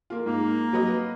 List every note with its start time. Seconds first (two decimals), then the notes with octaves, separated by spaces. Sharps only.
0.10 A#3 F4
0.26 G#2 A#3
0.73 F#3 B4 D#5